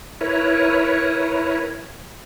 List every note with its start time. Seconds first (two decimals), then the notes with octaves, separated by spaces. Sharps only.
0.21 E4 A#4 B4 C#5